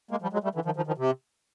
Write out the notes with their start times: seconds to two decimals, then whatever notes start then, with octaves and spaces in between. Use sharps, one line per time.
0.11 G#3 A#3
0.22 F3 G3
0.33 F#3 G#3
0.44 G3 A3
0.55 D3 E3
0.65 D#3 F3
0.76 D#3 F3
0.87 D#3 F3
0.98 C3